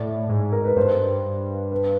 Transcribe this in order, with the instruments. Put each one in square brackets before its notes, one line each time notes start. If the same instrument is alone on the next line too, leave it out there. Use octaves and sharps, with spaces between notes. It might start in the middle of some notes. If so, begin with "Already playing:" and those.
Already playing: [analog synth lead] A2 [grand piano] D5
[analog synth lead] G#2
[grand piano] A#4
B4
[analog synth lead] G2 [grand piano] C5
[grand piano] B4